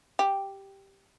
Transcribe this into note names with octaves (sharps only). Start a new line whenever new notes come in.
G4